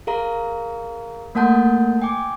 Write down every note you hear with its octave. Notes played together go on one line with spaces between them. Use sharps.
G#4 A#4 F5 A#5
A3 A#3 A#4 F#5 A5 G6
G5 G#5 D6